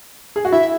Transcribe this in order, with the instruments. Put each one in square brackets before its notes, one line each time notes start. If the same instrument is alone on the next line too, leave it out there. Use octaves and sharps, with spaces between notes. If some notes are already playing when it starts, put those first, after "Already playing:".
[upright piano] G#4
F#4
[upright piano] E4 [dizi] E5